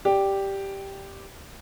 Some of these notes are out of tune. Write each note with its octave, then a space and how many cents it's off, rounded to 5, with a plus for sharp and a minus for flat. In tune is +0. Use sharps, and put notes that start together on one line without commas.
G4 +0 D5 +0